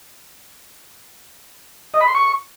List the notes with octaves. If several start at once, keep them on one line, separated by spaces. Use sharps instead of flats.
D#5
B5
C6
C#6